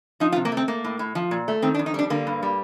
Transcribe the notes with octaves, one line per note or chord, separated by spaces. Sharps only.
F3 D#4
F4
C3
A#3
A3
C4
A3 A#3
A2
A2
F3
A#2
A3
D#3 C4
D4
F2
D#4
G3 D4
D3 A#3
G2
G3